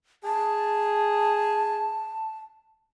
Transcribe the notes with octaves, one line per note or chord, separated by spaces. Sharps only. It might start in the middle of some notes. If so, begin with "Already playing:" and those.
G#4 A5